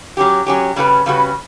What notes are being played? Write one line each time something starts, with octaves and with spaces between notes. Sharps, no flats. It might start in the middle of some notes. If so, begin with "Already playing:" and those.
F#3 C#4 G4
F#3 C#4 G4
C#3 G3 C#4 F#4 B4
C#3 G3 C#4 F#4 B4